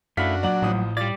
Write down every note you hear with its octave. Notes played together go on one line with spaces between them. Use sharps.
F#2 A3 D4 E4 F#4 F5 F6 B6
A#2 F#3 D5 F#5
A1 A2 F3 D#6
G3 F4 D5 A6